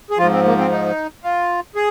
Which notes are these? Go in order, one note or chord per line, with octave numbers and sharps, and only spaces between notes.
G#4
G#2 F3 F4
C4
A#3
C4
D#4
F4
G#4